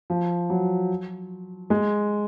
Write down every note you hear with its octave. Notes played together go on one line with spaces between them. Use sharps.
F3
F#3
G#3